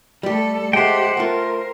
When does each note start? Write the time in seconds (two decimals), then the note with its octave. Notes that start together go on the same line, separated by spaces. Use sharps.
0.23 G3 A3 G4 A4
0.73 G#3 A3 G4 C5 F#5 G5
1.17 A3 F4 A#4